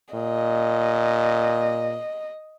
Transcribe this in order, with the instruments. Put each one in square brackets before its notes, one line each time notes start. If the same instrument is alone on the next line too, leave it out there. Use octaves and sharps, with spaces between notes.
[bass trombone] A#2 [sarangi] D#5